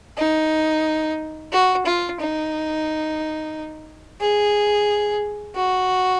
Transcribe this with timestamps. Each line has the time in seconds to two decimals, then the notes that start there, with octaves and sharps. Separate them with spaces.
0.17 D#4
1.52 F#4
1.85 F4
2.20 D#4
4.20 G#4
5.55 F#4